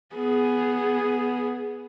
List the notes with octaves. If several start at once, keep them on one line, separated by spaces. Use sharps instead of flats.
B3 G#4